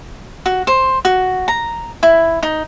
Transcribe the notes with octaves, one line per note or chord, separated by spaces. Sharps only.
F#4
C5
F#4
A#5
E4
D#4